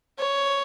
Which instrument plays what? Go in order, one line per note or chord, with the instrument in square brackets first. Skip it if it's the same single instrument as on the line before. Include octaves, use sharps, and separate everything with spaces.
[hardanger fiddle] C#5